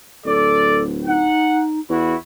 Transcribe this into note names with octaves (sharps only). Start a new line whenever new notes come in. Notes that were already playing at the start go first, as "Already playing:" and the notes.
D1 A4 D5
D#4 F#5
E2 E4 F#4